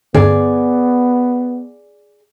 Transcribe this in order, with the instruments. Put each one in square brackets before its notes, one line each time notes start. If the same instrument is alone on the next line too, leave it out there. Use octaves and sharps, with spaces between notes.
[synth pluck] G2 D3 [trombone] B3 [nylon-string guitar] G#4 D5